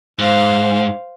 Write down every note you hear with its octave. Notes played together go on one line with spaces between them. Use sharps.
G#2 C5 F5